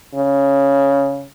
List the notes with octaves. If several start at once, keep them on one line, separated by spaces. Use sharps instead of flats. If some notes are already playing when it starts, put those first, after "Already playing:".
C#3